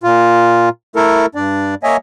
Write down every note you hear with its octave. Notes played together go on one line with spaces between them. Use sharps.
A#2 F4
A3 E4 A4 A#4
G2 D4 D5
A#3 C#5 D#5 E5 G#5